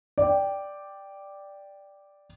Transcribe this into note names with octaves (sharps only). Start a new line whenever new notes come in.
D5 G5